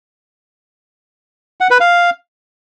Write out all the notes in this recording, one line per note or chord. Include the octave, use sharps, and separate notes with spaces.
F#5
B4
F5